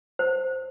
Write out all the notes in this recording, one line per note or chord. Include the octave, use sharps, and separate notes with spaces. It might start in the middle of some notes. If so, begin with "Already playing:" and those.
C5